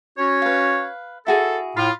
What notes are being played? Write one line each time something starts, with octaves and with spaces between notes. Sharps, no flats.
C#4 F#4 C#5
B4 F5
E4 F#4 G#4 A4
A2 F4 B5